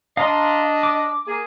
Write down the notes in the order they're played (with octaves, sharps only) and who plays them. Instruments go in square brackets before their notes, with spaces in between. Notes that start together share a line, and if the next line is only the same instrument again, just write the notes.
[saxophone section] D4 D#5 [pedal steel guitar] F5 A#5 C6
[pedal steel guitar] D6
[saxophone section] A#3 G#4